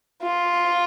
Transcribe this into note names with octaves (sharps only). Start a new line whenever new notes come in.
F4